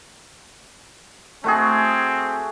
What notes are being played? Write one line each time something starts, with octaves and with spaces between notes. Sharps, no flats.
A3 C4 F#4 G#4